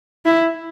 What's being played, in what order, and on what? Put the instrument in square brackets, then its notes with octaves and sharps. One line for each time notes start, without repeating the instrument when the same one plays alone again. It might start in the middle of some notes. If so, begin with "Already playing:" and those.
[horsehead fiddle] E4